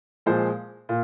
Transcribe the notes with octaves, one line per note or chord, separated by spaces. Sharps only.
A#2 F3 G#3 C5
A#2